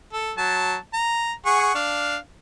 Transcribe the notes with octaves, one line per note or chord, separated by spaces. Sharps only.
A4
F#3 A5
A#5
G#4 F#5 C#6
D4 F5